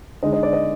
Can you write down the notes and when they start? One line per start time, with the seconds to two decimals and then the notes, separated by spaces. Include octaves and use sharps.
0.23 D3 G#3 D#4 D#5
0.33 D#5
0.43 D5
0.53 D#5